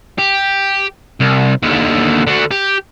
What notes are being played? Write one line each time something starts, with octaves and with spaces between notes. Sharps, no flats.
G4
C2
D#2 D3
D3 F#4
G4